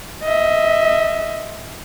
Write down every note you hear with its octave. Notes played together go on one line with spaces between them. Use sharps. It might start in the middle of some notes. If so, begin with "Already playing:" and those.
D#5 E5